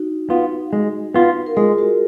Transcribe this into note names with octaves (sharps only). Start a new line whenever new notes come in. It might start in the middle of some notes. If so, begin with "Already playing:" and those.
Already playing: D#4 F#4
B3 F4
G#3
B3 F4
A#4
G#3 F4 G#4
F#4 A#4